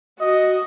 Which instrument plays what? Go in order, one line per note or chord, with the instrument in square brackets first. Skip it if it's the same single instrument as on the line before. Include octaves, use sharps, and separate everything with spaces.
[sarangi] F#4 [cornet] D#5